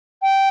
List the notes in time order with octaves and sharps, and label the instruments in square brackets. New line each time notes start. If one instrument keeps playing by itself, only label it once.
[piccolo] G5